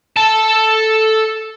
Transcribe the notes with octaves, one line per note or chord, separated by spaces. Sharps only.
A4 A5